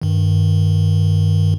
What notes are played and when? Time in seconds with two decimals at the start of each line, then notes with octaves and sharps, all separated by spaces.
0.02 G2 D#3